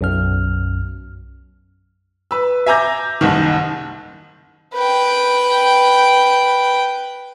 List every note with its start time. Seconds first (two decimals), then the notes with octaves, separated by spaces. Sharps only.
0.01 B1 F#2 F6
2.31 B4 E6
2.66 E5 G#5 A#5 D6 G6 A#6
3.21 F#1 C2 D#3
4.74 B4 G5